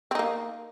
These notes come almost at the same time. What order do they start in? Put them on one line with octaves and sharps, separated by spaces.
C4 D#4 A#3